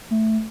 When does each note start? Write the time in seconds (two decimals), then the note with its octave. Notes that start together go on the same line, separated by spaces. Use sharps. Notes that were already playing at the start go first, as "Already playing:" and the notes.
0.11 A3